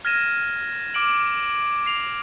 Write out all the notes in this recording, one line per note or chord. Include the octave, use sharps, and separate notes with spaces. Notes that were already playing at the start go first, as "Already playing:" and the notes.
F6 G#6 A#6 D#7 E7
D6 F6 D7 F#7
C7 F7